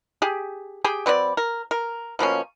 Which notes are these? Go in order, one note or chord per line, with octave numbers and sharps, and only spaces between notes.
G4 G#4
G4 G#4 G5
F#3 C4 B4 D5
A#4
A#4
B2 F3 A#3 C#4